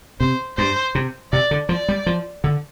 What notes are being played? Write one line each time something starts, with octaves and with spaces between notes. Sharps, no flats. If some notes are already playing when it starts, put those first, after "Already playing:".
C3 C5
G2 C5
C3
C3 D5
D3
F3 D5
G3
F3
D3